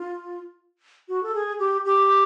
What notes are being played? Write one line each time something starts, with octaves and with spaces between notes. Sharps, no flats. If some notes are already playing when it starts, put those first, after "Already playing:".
Already playing: F4
F#4
A4
G#4
G4
G4